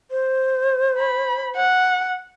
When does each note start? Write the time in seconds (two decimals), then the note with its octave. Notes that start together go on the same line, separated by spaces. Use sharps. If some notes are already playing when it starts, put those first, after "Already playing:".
0.11 C5
0.99 B5
1.56 F#5